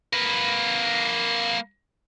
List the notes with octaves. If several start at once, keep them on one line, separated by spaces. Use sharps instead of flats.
A#3 B4